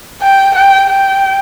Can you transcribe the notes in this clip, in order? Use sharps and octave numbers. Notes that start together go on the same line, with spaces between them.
G5
G5
G5